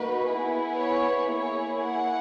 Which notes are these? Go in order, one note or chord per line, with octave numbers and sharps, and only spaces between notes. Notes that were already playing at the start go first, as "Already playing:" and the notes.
Already playing: A#3 D#4 F#4 B4
B3 E4 G#4
C#5
A#3 E4 G#4 C#5
F#5